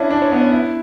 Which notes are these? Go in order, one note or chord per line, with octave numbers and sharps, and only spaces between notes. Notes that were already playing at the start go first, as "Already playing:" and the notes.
Already playing: C#4 D4 E4
D4
C#4
B3
C#4
E4